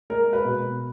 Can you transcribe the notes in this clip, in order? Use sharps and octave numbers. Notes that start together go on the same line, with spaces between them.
G#3 A#4
B4
B2